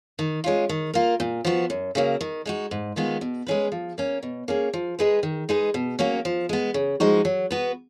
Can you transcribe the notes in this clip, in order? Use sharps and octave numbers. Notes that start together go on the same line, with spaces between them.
D#3
G#3 C#4 F4
D#3
A#3 F4 A#4
A#2
F3 B3 F#4
F#2
C#3 F#3 A#3
D#3
G#3 D#4 F#4
G#2
D#3 G#3 B3 F4
B2
G#3 C#4 G#4 B4
F3
A#3 C#4
B2
A#3 C#4 G#4
F3
G#3 D#4 G#4 B4
D#3
G#3 D#4 G#4 B4
B2
F#3 A#3 C#4 F#4
F3
G#3 B3
C#3
F3 G#3 D#4 F#4
F#3
B3 F#4 B4